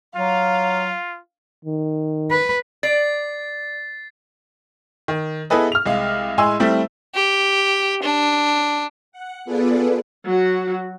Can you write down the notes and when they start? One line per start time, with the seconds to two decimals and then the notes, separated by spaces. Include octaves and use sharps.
0.16 F#3 F4 F5
1.65 D#3
2.30 B4
2.83 D5 A6 C7
5.08 D#3
5.50 B3 E4 G#4 A4 B4 D#5
5.72 F6 F7
5.86 C2 G#3 F5
6.37 A2 G#3 G#5 C6 E6
6.60 G3 A3 C4 E4
7.15 G4
8.03 D4
9.12 F#5
9.45 B3 F4 G#4 A4 B4 D5
10.25 F#3 F#4